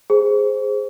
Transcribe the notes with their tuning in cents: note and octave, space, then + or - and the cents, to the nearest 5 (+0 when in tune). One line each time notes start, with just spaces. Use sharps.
G#4 +0 C5 +0